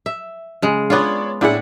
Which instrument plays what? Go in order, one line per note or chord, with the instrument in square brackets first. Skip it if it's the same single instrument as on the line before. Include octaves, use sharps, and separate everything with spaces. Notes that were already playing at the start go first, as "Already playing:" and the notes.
[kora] E5
C#3 G#3
[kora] B3 F4 [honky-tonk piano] D4 C#5 D5
[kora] A2 F#5 [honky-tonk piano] D4 E4 G#4